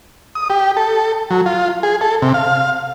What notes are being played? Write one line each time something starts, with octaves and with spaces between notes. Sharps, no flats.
D#6
G4
A4
F#3
F4
G#4
A4
C3
F5